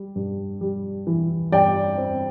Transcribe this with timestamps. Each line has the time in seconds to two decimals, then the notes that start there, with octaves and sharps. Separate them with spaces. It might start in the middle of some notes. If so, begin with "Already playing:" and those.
Already playing: G3
0.15 G2
0.61 G3
1.07 E3
1.52 G2 D5 G5
1.98 C4